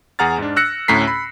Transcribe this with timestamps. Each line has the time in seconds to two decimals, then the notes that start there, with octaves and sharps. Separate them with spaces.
0.19 E2 G#4 F#5 A#5 F6 A6
0.38 G#2 D4
0.56 E6 F#6 A#6 C#7
0.88 D2 A2 C#4 A#5 B6 C7
1.07 B5